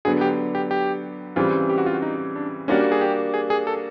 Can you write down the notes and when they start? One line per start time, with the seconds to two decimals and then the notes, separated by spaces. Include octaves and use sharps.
0.05 D3 F#3 B3 G#4
0.21 G4
0.55 G4
0.71 G4
1.36 C#3 E3 G3 C4 F4
1.70 G4
1.78 F#4
1.86 F4
1.94 F#4
2.02 D#4
2.36 D4
2.68 G3 A#3 C#4 D4 F#4
2.92 G#4
3.01 G4
3.34 G#4
3.50 G#4
3.67 A4